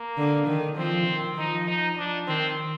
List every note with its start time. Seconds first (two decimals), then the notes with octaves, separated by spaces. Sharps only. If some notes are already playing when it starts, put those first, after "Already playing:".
Already playing: A#3
0.17 D3
0.47 D#3
0.77 F3 C4
1.07 D#3
1.38 F3 D#4
1.67 D#4
1.98 D4
2.27 D#3 C4